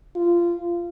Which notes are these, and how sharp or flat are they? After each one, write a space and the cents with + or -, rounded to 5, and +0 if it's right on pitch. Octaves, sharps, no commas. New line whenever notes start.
F4 -20